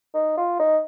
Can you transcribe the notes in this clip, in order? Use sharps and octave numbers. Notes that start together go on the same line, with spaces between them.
D#4
F4
D#4